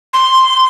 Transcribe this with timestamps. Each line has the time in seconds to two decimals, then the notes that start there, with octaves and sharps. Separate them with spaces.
0.13 C6